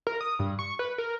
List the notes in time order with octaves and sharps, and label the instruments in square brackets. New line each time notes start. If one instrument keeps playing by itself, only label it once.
[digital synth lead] A#4
D#6
G2
C#6
B4
A#4